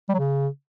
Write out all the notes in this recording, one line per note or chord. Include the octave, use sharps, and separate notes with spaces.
G3
F#3
C#3